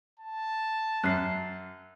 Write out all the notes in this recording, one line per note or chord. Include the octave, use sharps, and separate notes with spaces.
A5
F#2 F#6 C7